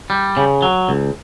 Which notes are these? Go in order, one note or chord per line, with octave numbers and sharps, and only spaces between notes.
G3
C#3
F#3
C#2